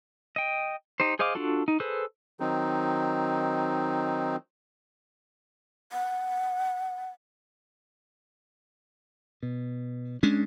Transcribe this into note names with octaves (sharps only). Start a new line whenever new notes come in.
D#5 G5
D#4 G4 C5
G#4 C5 D#5 F5 D6
D4 F4 F#4 A4
D#4
G#4 A4 B4 C5
D#3 F#3 C4 D#4
F#5
B2
G#3 C#4 D4